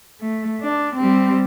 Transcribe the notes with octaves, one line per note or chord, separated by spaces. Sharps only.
A3
D4
G3 C4